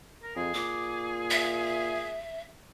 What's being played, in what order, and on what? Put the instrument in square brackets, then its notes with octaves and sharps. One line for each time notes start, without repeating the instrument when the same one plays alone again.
[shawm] A#4
[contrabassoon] F2 [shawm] G#4
[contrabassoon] A#2 [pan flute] D6
[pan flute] E5